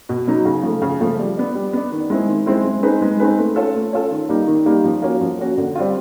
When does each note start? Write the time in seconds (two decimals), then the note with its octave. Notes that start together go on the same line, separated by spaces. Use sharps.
0.09 B2
0.27 F#3 B3 D#4
0.45 C#3
0.63 F3 A3
0.82 C#3
1.00 F3 A3
1.19 G3
1.37 B3 D4
1.55 G3
1.73 B3 D4
1.92 D#3
2.10 G#3 C4 E4
2.28 D#3
2.46 G#3 C4 E4
2.65 G#3
2.82 C4 D#4 G#4 B4
3.02 G#3
3.20 C4 D#4 G#4 B4
3.38 A3
3.56 C#4 F4 A4
3.75 A3
3.93 C#4 F4 A4
4.11 D#3
4.29 G3 A#3 D#4 G4
4.48 D#3
4.66 G3 A#3 D#4 G4
4.84 F3
5.02 A#3 C#4 F#4
5.21 F3
5.39 A#3 C#4 F#4
5.57 D3
5.75 G3 C4 F4